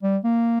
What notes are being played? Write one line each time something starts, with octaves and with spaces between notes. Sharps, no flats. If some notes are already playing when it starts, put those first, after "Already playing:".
G3
A#3